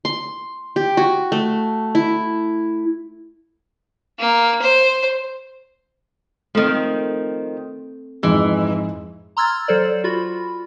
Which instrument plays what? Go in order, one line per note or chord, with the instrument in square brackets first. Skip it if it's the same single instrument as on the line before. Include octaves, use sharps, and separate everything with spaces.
[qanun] C6
G4
F#4
A3
E4
[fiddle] A#3
C5
[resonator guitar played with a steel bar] D#3 F3 [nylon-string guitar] A3 C4
[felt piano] F2 G#2 G#3 [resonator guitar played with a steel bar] E3
[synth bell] A#5 C6 E6 F6 G#6 A6
F#3 A4 C5 D5
F4 F#4 B5